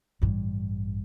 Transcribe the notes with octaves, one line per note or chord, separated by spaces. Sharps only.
A1 G2